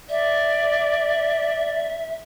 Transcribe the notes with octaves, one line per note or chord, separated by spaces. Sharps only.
D5 E5